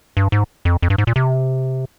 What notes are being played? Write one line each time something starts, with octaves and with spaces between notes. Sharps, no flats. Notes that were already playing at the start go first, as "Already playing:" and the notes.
G2
G#2
F2
F2
G2
G#2
A#2
C3